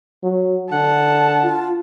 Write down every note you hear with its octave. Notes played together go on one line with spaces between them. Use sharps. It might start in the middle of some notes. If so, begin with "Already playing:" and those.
F#3
D3 F#5 A5
F4